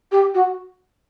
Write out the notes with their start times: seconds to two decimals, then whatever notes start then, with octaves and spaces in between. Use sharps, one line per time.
0.12 G4
0.34 F#4